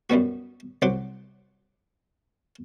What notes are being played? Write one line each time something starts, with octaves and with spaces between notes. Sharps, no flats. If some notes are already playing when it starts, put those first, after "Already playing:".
F#2 G3 B3 F#4
C2 F#3 C5 F#5 D6